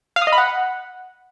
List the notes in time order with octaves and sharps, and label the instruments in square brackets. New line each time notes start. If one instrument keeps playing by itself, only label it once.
[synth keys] F5
D#6
D#5
B5
F#5